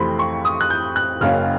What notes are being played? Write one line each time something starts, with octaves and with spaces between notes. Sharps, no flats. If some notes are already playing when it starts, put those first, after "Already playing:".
Already playing: F2 C3 E3 A3 C4 B5 C6
C#6
D#6
F#6
G6
F#6
F#1 F#2 C#3 F#3 A#3 F6